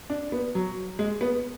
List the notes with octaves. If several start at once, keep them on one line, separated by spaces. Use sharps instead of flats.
D4
B3
F#3
G#3
B3